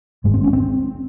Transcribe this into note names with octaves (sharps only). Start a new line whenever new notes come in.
G#1 G#2 G#3
C4
C#4
C4